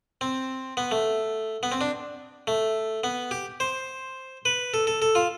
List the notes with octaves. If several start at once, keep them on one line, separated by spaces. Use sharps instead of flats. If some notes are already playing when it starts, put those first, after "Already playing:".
C4
B3
A3
B3
C4
D4
A3
B3
G4
C5
B4
A4
A4
A4
F4